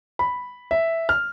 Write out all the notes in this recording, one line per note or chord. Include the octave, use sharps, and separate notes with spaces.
B5
E5
F6